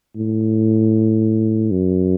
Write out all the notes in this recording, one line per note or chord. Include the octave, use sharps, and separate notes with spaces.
A2
F#2